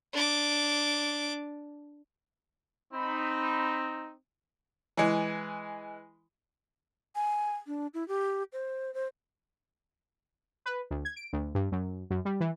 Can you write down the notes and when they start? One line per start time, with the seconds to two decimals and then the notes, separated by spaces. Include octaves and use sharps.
0.13 D4 D6
2.93 C4 D#4 B5
4.97 E3 G#3
7.16 G#5
7.67 D4
7.94 E4
8.08 G4
8.53 C5
8.94 C5
10.66 B4
10.91 D2
11.05 G#6
11.16 D7
11.33 D2
11.55 G2
11.72 F#2
12.10 F#2
12.25 G3
12.40 E3